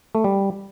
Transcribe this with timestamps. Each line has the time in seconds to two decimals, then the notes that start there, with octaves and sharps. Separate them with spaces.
0.15 A3
0.24 G3